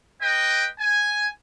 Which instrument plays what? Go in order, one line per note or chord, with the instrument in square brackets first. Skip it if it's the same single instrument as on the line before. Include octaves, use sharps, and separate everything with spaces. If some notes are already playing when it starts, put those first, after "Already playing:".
[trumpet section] B4 D#5 G5
G#5